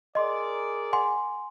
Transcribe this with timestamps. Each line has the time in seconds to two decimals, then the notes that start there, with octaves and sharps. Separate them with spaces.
0.15 G#4 A#4 D5 D#5 C6
0.93 F#5 G#5 C6